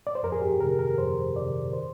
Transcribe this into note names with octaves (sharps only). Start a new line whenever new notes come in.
D5
C5
F2 A#4
G#4
G4
C3 D#3 A#4
A#4
F2 C5
C3 D#3 D5
C5